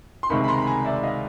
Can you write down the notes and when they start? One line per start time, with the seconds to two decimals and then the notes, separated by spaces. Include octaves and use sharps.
0.23 C6
0.30 C#2 C3 D#3 G#3 B5 C#6
0.44 B5
0.48 A#5 C6
0.62 B5
0.67 G#5 A#5
0.85 D5 E5
1.04 D#5 F5